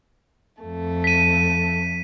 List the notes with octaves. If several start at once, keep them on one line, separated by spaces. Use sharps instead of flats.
F2 A3
B6 D#7